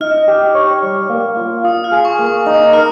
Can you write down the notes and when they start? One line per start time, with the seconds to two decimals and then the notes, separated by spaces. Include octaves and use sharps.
0.01 D#4 F6
0.28 G4
0.55 C#5
0.83 G3
1.10 A#3
1.37 F4
1.64 F4 D#6
1.84 F6
1.92 G#4
2.05 C#6
2.19 A#3
2.26 C#6
2.46 D#4 D#6
2.73 A#4 F6